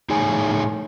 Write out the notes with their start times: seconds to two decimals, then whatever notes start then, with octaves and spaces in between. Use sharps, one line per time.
0.10 A2 D#4 G#4 C#5 G#5